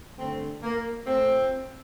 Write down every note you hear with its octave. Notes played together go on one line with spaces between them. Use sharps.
G2 D3 A3 C4
A#3
A#2 A3 C4